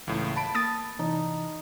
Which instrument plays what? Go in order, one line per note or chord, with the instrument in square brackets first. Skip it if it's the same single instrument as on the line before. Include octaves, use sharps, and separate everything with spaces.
[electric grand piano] C#2 A2 [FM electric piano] E3 A#3
[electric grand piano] A5 B5 D7
[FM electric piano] A#3 [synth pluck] D#6 A6
[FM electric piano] C3 E3 [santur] D#4